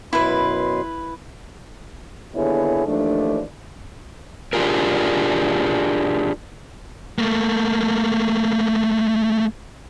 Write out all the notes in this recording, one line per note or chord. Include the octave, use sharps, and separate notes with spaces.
F#2 B2 E4 B4 C6
D#2 D3 B3 E4 G#4 C#5
D#2 E3 F3 A3 D4
D4 F4 G4 G#4 A#4
A3 A#3